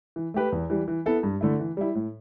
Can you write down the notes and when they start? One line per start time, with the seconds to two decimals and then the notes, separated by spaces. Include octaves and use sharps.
0.16 E3
0.34 A3 G4 B4
0.52 E2
0.70 E3 G3
0.88 E3
1.06 B3 E4 A4
1.23 G2
1.41 D3 A3 E4
1.59 E3
1.77 G3 E4
1.95 A2